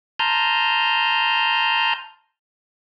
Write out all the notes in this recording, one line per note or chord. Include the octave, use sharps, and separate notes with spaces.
A5 A#5 C6 D#6 F6 G6